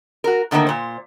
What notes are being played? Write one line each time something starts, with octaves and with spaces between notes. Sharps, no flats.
F#4 A#4
A2 D3 D#3 F3 A#3 A4
A#2 C5